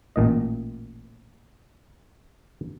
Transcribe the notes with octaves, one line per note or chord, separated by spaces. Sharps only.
A1 A#2 D#5